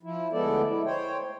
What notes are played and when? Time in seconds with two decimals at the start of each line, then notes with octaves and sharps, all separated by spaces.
0.03 F3 E4
0.33 D2 G#3 B3 E4 A4 D5
0.67 E4
0.86 C5 C#5 G5